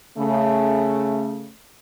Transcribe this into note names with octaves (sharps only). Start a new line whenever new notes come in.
C#3 A3